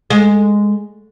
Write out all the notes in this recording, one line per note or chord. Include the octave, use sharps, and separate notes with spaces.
G#3